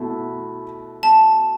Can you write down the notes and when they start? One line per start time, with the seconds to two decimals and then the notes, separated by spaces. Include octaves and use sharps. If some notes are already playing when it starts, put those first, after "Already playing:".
Already playing: B2 A3 E4
1.03 A5